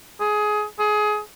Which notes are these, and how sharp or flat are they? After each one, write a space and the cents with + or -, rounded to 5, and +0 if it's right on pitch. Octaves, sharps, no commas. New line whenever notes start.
G#4 +20
G#4 +20